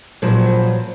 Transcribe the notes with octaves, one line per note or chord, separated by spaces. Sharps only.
A#2 F3 F#3 B4 C5